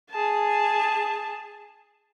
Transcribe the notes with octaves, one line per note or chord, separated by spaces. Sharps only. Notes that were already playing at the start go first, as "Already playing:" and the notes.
G#4 A5